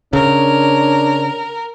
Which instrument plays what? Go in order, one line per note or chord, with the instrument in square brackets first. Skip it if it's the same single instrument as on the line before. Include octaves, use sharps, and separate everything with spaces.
[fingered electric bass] C#3 [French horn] D4 [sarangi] A#4 [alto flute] C#5